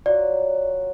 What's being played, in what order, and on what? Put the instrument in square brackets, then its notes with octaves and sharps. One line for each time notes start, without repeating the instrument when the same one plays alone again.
[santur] F#3 F4 F#4 [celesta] D5